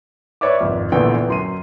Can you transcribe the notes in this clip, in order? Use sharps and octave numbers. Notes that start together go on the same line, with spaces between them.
B4 C#5 D5 E5 D6
G#1 F2
A#1 A#2 D3 E3 B3 G5
F#2 C6 D#7